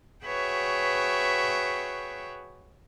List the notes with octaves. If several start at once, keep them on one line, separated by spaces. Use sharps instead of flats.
F#4 G#4 B4 C#5 E5 G5